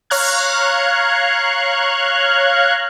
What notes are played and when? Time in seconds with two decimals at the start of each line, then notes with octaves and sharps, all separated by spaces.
0.10 C#5 F5 A#5 F6 F#6 G#6